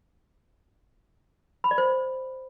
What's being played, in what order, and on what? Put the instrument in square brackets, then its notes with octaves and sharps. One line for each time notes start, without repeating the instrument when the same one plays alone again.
[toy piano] B5
D5
C5